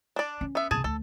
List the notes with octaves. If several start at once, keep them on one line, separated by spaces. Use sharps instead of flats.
D4 D5
C#4
B3 E5
C2 A#2 G#4 G#5 A5
D2 A4